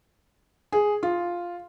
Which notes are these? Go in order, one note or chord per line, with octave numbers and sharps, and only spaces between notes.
G#4
F4